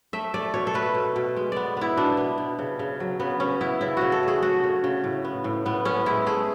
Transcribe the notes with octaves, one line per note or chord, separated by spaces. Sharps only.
A3 E5
A3 D5
B2 C#5
A4
A3 B4
B2
B2
G#3
B3 D5
B3 E4
B2 D4
B3
B2
C#3
C#3
F#3
C#3 B3
C#3 C#4
B3 E4
C#3 E4
C#3 F#4
A4
A3 G#4
A3 F#4
C#3
C#3
A2
B3
A2
A2 B3
B3 C#4
G#3 E4
A3 G#4